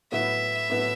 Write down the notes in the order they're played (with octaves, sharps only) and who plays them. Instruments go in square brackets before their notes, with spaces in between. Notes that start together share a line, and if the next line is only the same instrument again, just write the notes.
[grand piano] A2 F#3 B3 E4 B4 [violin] E5
[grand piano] A2 F#3 B3 E4 B4